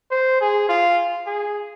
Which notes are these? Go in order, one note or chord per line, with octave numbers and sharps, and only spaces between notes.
C5
G#4
F4
G#4